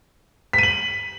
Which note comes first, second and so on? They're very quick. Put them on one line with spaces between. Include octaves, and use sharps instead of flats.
B6 D#7 F#7